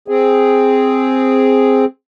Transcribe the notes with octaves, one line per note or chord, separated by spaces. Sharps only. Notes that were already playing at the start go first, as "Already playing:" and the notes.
C4 G#4